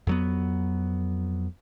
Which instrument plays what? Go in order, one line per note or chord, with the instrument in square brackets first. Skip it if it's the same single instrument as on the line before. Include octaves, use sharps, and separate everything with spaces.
[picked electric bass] F2 F#3 B3